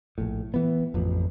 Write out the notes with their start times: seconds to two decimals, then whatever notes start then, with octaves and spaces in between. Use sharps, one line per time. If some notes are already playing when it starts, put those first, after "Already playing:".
0.18 A#1 A2
0.54 E3 B3
0.94 A1 F2